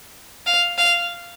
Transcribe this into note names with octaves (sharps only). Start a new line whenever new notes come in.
F5
F5